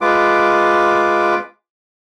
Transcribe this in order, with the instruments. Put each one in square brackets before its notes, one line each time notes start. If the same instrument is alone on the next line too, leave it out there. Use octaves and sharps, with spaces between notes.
[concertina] G#3 F4 B4 D6